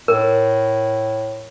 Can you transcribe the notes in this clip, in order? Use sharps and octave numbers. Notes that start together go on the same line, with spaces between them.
A2 A#4